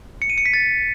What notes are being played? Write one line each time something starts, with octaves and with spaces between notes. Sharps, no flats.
C#7
D#7
C#7
B6
A6